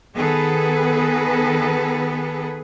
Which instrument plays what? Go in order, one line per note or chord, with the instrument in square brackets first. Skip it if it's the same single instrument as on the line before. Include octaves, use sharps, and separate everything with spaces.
[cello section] D#3 B3 G#4 A4 B4